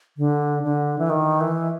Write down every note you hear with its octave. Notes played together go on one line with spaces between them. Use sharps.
D3
D3
E3
D#3
E3